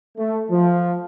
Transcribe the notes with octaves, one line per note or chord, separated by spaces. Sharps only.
A3
F3